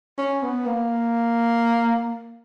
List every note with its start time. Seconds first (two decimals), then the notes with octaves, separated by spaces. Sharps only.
0.18 C#4
0.43 B3
0.66 A#3